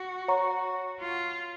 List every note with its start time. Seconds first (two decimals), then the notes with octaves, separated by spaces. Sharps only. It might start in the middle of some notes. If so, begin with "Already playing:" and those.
Already playing: F#4
0.28 C#5 F#5 A#5 C#6
1.01 F4